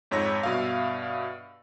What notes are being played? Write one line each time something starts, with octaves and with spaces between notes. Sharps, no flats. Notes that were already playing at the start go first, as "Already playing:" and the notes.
F2 G#2 C#5 E6 A#6
G2 B2 E5 F5